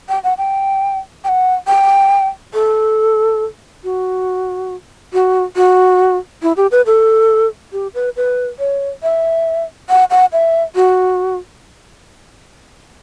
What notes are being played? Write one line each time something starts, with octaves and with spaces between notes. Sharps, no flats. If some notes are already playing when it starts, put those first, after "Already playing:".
G5
F#5
G5
G5
F#5
G5
A4
F#4
F#4
F#4
E4
G4
B4
A4
G4
B4
B4
C#5
E5
F#5
F#5
E5
F#4